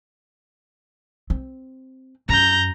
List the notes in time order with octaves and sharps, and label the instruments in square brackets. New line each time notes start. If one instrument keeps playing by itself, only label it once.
[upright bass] C4
[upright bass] F#2 [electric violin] A#5 G6